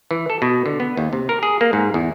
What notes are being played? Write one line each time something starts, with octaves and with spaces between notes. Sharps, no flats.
E3
A4
B2
D3
B3
D#2
C3
A#4
G#4
A#3
G#2
E2